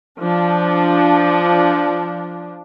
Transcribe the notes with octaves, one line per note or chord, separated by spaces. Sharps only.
F3 D4